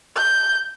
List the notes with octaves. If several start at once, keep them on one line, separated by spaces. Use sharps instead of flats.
G6